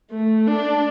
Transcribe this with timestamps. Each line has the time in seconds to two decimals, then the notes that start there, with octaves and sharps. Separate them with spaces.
0.11 A3
0.47 D4